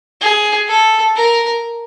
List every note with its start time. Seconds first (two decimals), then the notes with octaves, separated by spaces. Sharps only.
0.21 G#4
0.68 A4
1.15 A#4